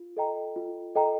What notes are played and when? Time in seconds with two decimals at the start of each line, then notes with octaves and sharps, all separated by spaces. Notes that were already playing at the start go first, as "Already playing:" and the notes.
Already playing: F4
0.17 A4 D#5 G5 A#5
0.56 F4
0.95 A4 D#5 G5 A#5